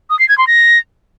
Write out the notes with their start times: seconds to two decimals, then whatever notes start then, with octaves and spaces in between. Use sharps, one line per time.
0.10 D#6
0.19 C7
0.28 G#6
0.38 C6
0.47 A#6